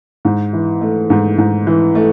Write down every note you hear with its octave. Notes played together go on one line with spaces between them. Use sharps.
G#2
E3
A3
G#2
G#2
E3
A3